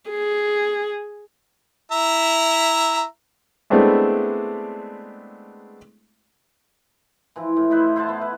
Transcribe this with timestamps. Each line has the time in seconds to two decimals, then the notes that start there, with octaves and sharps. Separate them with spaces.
0.11 G#4
1.92 E4 E5 A#5
3.70 G#3 A3 B3 C4 D4 E4
7.36 E3 F3 E4
7.57 A2
7.70 D#4 E4 B4 C5
7.96 E4 C5 F#5 A5
8.09 B3
8.21 B4